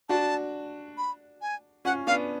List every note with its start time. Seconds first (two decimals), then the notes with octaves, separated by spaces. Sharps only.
0.09 D4 F#4 A5
0.98 B5
1.42 G#5
1.85 C#4 F4 F#5
2.07 B3 D4 F5